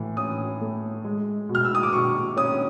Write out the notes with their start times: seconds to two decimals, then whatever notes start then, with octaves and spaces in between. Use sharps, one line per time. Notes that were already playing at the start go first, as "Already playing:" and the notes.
Already playing: A2 E3
0.17 C#4 D#6
0.61 A3
1.05 G#3
1.49 B2
1.55 F6
1.65 E6
1.75 D#6
1.83 D6
1.93 B2 C#6
2.37 C#4 D#6